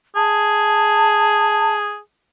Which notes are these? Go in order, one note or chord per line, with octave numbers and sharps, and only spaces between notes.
G#4 A5